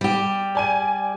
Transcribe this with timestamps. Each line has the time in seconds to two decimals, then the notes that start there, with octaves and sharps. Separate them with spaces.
0.01 G3 G4
0.55 D5 G#5 D#7